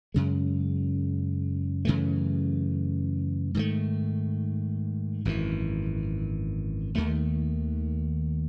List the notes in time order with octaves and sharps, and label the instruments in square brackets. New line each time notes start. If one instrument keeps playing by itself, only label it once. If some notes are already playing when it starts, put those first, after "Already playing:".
[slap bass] F#2 C#3 G#3
F#2 C#3 E3 A3
G#2 D#3 A3
G#1 F#2 E3
D#2 D#3 A3